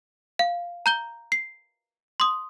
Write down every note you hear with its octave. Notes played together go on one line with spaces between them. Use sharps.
F5
A#5 G6 G7
C7
C6 D#6